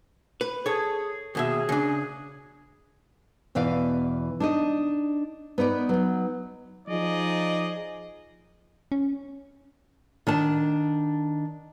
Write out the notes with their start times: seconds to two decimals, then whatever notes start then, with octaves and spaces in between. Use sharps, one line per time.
0.41 B4
0.66 G#4 A4 C#5
1.35 D#2 B2 G#4 E5
1.69 C#3 D4
3.55 E2 B2 E3 D5 F5
4.40 D4 D#4 D#5
5.58 B3 D#4 B4 D5
5.89 F#3 D#4
6.88 F3 D#4 G#4 D5 D#5
8.92 C#4
10.27 D#3 D4 A5